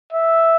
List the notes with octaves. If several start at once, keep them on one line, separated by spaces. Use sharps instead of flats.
E5